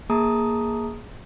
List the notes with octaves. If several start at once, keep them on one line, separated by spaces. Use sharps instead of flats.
A#3 G#4 A5 A#5 D#6